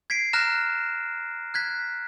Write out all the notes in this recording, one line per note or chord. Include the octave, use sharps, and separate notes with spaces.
G#6 B6 C7 D7
A#5 F6 F#6 A#6 E7
F#6 G#6 B6